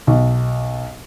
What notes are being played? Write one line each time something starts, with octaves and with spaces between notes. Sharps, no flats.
B1